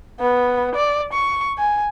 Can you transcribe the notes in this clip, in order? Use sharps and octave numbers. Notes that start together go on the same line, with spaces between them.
B3
D5
C#6
G#5